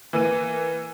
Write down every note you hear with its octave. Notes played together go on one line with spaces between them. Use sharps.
E3 A#3 D#7